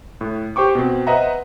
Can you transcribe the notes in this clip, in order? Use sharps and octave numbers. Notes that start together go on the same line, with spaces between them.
A2
G4 C5 G5 C#6 D6
B2 C4
B4 C5 D#5 E5 F#5 A#5